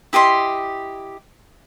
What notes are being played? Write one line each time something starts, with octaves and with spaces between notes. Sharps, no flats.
E4 G4 D#5 C6